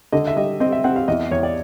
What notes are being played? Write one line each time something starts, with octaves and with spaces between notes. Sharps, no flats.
D3 D#5
E5
G3 D#5
C4 D#5
E5
C4 F#5
F5
E2 D#5
E2 C#5
D5